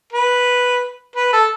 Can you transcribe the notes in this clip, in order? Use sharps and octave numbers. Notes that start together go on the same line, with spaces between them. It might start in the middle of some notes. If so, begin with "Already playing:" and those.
B4
B4
A4